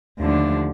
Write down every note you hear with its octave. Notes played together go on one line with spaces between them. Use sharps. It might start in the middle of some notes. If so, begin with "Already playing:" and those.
D#2 D3 F3 A3 D4